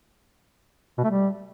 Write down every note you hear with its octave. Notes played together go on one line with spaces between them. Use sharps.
B2
A3
G3